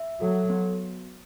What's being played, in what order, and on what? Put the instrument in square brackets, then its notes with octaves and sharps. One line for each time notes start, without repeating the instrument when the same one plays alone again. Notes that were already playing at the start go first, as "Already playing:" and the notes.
Already playing: [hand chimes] E5
[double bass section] F#3 [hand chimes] A4
[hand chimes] B3